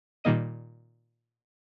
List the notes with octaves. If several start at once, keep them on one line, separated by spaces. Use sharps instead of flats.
A#2 D#3 G3 A#3 D#5 D#7